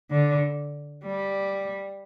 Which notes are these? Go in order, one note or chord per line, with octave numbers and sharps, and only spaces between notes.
D3
G3